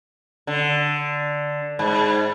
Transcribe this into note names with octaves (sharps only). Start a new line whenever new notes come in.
D3
G#2